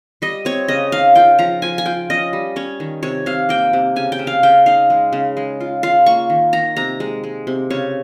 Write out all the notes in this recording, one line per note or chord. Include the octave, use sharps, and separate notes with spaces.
G3 D#5
C4 C#5
C#3 D#5
D#4 F5
F4 G5
F3 A#5
F3 G#5
G#5
F4 G5
C#4 D#5
G3
C#4 C#5
D#3
C3 C#5
C3 F5
A#3 G5
C3
C#3 G#5
G5
C#3
F5
C#3 G5
D#4 F5
G#3
C#3
G#3
F4
F4 F5
A#3 C#6
D#3
D#3 A#5
C3 A#5
G#3
G#3
C3
C#3 C#5